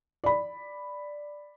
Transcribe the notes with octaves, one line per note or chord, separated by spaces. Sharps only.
D5 B5